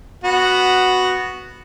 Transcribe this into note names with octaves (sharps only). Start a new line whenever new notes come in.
B3 F#4